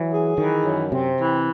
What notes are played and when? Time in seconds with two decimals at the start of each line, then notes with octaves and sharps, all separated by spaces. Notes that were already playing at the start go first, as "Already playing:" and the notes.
Already playing: E3 F#3
0.12 G#4
0.38 D#3 E3
0.66 F#2
0.92 C3 C4
1.19 E3